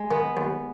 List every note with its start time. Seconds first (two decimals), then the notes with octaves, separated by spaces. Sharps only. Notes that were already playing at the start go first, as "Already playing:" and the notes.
Already playing: G#3
0.11 D#3 B3
0.37 D#2